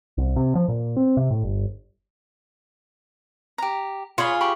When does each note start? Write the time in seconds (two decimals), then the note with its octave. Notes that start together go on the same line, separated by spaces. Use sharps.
0.18 C2
0.36 C3
0.55 F3
0.68 A#2
0.97 C4
1.17 C3
1.30 A2
1.44 G1
3.58 G4 A#5
4.18 F4 G#4 C#5 B5
4.41 G4 B5 C#6